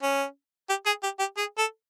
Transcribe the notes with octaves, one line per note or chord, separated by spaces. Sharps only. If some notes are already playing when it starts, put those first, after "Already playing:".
C#4
G4
G#4
G4
G4
G#4
A4